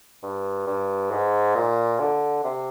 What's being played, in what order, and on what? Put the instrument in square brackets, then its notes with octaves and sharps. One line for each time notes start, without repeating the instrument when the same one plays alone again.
[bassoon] G2
G2
G#2
A#2
D3
C3